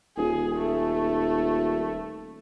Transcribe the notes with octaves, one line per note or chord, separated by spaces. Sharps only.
D#1 G#4
A3